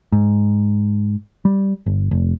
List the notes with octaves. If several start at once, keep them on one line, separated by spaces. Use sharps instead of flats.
G#2
G3
G1
F1